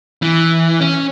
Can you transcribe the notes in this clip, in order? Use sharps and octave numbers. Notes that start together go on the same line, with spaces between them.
E3
C#4